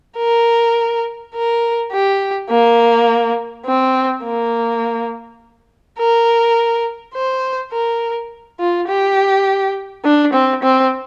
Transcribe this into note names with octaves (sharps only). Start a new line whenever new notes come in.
A#4
A#4
G4
A#3
C4
A#3
A#4
C5
A#4
F4
G4
D4
C4
C4